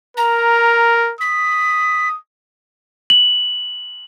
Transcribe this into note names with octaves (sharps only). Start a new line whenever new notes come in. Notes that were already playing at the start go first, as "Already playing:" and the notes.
A#4 A#5
D#6 B6
F#7